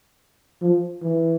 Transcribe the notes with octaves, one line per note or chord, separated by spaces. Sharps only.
F3
E3